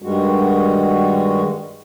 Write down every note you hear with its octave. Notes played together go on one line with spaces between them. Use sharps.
G2 D#3 G3 G#3 F#4